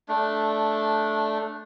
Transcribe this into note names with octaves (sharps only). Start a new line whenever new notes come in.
A3 D4